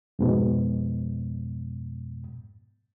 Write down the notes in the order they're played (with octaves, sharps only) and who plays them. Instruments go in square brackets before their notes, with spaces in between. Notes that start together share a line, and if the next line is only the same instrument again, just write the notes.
[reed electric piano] F2 G#2 B2